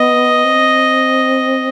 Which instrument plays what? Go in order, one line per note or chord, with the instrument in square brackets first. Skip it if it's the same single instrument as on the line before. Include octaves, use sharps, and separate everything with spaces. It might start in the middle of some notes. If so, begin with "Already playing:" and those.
Already playing: [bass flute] B3 [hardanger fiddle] D#5
[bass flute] C4